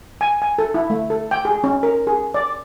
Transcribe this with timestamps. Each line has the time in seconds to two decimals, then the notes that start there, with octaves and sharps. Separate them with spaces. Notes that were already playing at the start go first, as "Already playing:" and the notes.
0.21 G#5
0.42 G#5
0.59 A4
0.74 E4
0.90 A3
1.10 A4
1.31 G5
1.45 G#4
1.64 C#4
1.83 A#4
2.07 G#4
2.34 D5